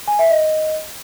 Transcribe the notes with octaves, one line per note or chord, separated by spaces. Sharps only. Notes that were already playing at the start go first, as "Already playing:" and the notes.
G#5
E5
D#5